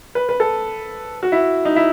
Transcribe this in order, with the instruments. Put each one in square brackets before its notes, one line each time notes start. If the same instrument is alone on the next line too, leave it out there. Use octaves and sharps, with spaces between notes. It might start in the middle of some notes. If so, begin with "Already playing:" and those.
[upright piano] B4
B4
A4
F#4
E4
D#4
E4